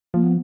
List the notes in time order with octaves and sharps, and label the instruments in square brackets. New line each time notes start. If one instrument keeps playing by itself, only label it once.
[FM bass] F3 [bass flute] A#3
[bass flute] B3